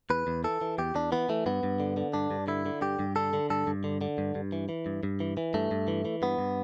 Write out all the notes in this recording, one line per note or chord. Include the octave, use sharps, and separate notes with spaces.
E2 B4
E2
E3 A4
E3
E2 G4
E2 D4
E3 B3
E3 A3
G2 B3
G2
D3
D3
G2 D4
G2
D3 E4
D3
G2 G4
G2
D3 A4
D3
G2 A4
G2
D3
D3
G2
G2
E3
E3
G2
G2
E3
E3
G2 A3
G2
E3
E3
G2 B3
G2